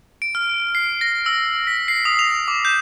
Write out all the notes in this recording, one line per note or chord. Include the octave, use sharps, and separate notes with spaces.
D7
F6
C7
A#6
E6
B6
C7
D#6
F7
D6
G6